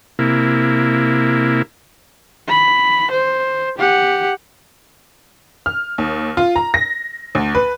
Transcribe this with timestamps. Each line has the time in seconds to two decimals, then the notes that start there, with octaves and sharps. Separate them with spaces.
0.19 C3 A#3 E4
2.49 B5
3.11 C5
3.78 G4 F#5
5.66 F6
5.98 D#2
6.37 F4
6.56 A#5
6.74 A#6
7.35 D2
7.55 B4